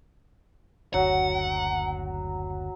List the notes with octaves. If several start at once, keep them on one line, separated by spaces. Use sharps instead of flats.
F#1 D2 F#3 F#5